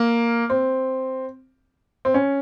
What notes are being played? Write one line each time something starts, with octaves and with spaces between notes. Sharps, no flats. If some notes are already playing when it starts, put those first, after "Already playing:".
Already playing: A#3
C4
C4
C#4